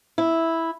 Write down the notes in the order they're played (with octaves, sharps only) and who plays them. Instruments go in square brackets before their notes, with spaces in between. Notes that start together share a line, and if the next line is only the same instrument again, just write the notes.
[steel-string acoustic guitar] E4